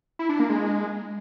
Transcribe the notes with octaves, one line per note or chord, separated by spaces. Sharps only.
E4
D4
A#3
G#3